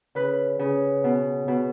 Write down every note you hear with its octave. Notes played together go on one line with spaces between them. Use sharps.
C#3 B4
C#3
B2
B2